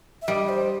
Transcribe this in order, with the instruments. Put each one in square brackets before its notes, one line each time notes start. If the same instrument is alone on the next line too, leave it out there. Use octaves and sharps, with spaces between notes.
[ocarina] E5
[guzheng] G3 [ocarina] D#5
[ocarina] C5